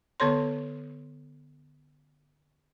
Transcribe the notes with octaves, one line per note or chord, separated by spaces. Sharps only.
D3 B3 A4 C#5 C6